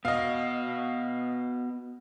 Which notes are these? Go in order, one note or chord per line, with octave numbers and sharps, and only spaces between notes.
B3 F#4 D#5 F5